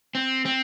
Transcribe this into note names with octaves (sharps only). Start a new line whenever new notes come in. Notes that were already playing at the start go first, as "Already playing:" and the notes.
C4
C4